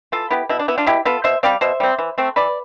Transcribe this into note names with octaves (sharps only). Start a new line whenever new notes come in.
E3 F4 A4
B3 E4 G4
B2 E4
D4
B3 E4
D4 F4
B2 E4 G4
B3 F4 A4
B2 C5 E5
G3 C4 D5 F5
B2 C5 E5
G3 C4
E3
A3 C4
E3 B4 D5